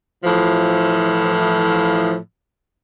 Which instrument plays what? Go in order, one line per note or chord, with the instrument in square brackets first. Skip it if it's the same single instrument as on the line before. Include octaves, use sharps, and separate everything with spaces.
[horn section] A2 E3 F3